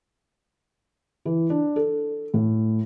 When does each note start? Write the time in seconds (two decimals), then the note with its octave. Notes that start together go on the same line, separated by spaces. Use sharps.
1.25 E3
1.50 D4
1.76 A4
2.34 A2